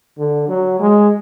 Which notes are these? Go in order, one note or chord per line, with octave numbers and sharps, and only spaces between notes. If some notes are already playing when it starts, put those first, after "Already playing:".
D3
F#3
G#3